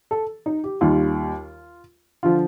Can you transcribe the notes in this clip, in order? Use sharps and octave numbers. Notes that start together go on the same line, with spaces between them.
A4
D#4
G4
D#2 D#3 G3 F4
D3 F3 F4